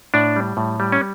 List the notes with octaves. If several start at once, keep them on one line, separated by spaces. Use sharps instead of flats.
A2 D4
G3
A2
G3
C#4